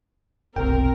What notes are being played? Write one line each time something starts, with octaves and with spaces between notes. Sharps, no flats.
F1 B1 C4 A#4 G5